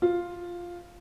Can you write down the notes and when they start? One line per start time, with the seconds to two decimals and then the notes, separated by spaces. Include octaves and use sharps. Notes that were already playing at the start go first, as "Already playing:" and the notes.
0.02 F4